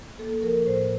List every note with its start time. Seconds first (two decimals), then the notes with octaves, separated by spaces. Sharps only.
0.18 A#3 A4
0.42 F3 A#4
0.66 A2 C5